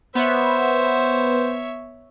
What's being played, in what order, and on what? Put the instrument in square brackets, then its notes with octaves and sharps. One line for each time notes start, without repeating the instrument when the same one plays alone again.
[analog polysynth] B3 [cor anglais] C5 [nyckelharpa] C#5 E5